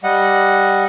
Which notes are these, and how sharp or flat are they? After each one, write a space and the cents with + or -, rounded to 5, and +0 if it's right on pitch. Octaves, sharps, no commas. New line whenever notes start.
G3 +0 D#5 +0 F#5 -10